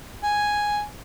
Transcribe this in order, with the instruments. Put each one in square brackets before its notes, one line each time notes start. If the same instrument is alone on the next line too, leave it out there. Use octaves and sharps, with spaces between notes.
[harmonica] G#5